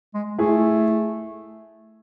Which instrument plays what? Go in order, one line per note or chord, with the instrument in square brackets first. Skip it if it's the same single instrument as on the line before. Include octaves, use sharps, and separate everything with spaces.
[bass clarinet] G#3
[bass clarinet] A3 [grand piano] E4 G#4